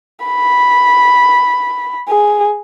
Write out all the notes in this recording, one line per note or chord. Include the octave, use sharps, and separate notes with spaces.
B5
G#4